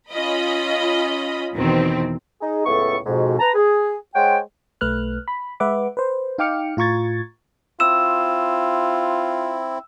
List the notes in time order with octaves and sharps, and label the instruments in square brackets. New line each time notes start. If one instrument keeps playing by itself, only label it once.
[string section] C#4 F4 D#5 B5
E2 B2 D#3 E3 C4
[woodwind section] D#4 G#4
C#2 A2 B3 E4 A4 C#6
F2 G#2 B2
B4 A5 A#5
G#4
G#3 C5 C#5 F#5 G5
[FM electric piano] B1 A3 B4 F6 F#6
B5
G#3 B4 E5 F#5 D6
B4 C5
D#4 F5 G5 D6 F6 C#7
A2 F4 A#5 C#6 G#6 A6
[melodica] C4 E4 [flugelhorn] F4 [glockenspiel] E6 E7